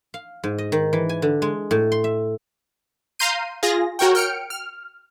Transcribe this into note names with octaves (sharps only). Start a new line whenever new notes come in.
F5
G#2
D#5
D#3
E3
G#5
D3
G#3
A2
C6
E5
F5 A#5 C6 G6 C7 D#7
F4 G#4 A#6
F#4 A#4 C#5 G5
G5 F6 C#7 D7
F6